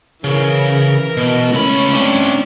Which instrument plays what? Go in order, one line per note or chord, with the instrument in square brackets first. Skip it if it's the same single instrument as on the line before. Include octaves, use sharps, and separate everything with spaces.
[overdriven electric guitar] C#3 [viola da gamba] E3 A#4
[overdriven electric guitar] B2
[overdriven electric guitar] C#2 B5 [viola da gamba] A3 C#4
[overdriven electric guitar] C4 D4